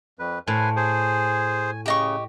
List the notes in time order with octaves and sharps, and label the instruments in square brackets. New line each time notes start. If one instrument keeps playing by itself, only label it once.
[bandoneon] F2 B4
[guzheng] A2 [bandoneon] B4 C5 G#5
[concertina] G#4 C5 [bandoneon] G#5
[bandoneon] C#3 [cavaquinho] G4 D#5 C#6